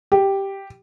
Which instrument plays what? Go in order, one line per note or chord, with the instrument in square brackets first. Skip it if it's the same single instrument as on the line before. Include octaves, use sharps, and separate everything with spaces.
[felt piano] G4